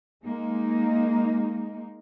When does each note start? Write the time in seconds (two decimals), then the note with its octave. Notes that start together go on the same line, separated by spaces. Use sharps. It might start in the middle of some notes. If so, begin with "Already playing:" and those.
0.25 G#3 A#3 D#4